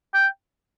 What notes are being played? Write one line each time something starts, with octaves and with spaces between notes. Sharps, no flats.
G5